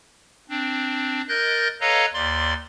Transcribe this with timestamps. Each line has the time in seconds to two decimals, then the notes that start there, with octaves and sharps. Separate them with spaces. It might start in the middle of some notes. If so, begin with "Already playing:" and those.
0.49 C4 D4
1.29 A#4 D#5 F#6 G6 A6
1.81 A4 B4 C#5 D#5 F5 A#5
2.14 D#2 D5 C6